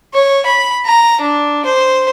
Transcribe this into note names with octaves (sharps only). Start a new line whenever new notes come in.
C#5
B5
A#5
D4
C5